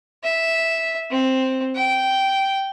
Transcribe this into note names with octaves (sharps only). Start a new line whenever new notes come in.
E5
C4
G5